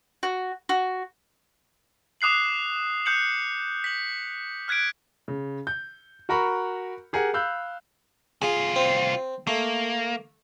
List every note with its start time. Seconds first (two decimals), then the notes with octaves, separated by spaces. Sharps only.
0.23 F#4
0.69 F#4
2.21 D6 D#6 F#6 C7 F#7
3.06 D#6 F#6 G6 C#7 F#7
3.84 B6 F#7
4.68 F6 F#6 G#6 B6 D7
5.28 C#3
5.67 G6
6.29 F#4 A#4 A#5 B5 C#6
7.13 G4 G#4 A#4 F#5
7.34 F5 B5 E6 F#6 G6
8.42 C2 F4 G#4
8.76 C4
9.47 A3 A#3